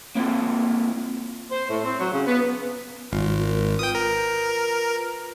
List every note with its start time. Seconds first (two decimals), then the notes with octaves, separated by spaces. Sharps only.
0.15 A#3 C4 E4 F4 A4
1.51 C5
1.70 A2
1.84 C4
1.99 F#3
2.13 C#3
2.27 B3
3.12 G#1 G#3 F4
3.41 A#4
3.79 F4 B4 G5 D#6
3.95 A#4